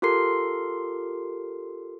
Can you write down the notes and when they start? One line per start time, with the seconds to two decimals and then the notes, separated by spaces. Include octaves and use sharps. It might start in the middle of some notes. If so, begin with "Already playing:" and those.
0.02 F4 G4 A4 A#4 C6 C7